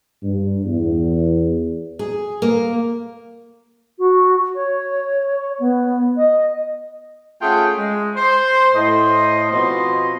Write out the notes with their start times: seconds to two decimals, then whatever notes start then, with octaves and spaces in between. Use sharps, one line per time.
0.23 G2
0.64 E2
1.99 G#4
2.42 A#3
3.99 F#4
4.55 C#5
5.60 B3
6.17 D#5
7.42 A3 C#4 F4 G#4 F#5 G5
7.78 G#3
8.16 C5
8.74 A2 C5 D#5
9.51 B2 F3 C4 D#5 C6